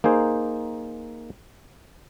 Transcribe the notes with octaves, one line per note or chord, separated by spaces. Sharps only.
A#3 D#4 G#4 C5